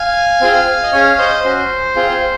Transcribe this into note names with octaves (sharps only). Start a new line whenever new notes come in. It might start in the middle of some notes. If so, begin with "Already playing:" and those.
Already playing: F5 G#5
C4 F4 G#4
D#5
C#4 G#4 C#5 F5
C5 D#5
C#4 F#4 C5
C4 F4 G#4